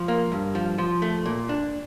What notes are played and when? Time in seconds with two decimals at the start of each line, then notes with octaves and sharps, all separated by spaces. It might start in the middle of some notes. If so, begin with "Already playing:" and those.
Already playing: F3
0.08 A#3
0.32 G2
0.55 F3
0.78 F3
1.02 A3
1.26 A#2
1.49 D4